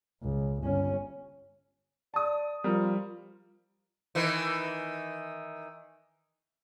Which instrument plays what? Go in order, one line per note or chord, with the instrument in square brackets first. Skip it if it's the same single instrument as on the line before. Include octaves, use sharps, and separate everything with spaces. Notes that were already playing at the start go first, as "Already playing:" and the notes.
[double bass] C#2
G1 C#4
[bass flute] D5 [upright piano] A5 D#6
[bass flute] F3 [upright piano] G3 A#4
[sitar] D#3 E3